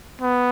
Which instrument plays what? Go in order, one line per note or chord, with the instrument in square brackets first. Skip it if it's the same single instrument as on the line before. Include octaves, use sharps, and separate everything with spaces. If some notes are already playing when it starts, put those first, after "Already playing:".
[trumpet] B3